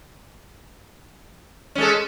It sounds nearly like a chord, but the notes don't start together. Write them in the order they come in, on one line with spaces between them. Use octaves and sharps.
C#4 G#3 A4